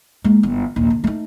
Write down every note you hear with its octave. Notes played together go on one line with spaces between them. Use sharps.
G#3 A#3
G1 E3
A#1 D#2
D3
A3 D#4